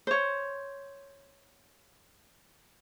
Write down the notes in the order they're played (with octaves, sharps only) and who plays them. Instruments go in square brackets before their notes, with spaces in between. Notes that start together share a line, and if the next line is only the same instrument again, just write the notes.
[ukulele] C5 C#5